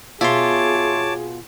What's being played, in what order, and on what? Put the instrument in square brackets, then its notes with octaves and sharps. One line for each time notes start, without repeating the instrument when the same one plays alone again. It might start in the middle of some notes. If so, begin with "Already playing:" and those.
[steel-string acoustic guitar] B2 F4 [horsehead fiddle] G#4 [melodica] C#5 A5 D6 [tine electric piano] E5 C6